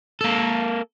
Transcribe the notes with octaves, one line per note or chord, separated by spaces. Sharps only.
A#3 A4